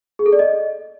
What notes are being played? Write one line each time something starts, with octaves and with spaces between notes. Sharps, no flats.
G#4
A4
D5
D#5